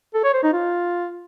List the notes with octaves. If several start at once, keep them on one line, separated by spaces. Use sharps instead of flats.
A4
C#5
C5
D#4
F4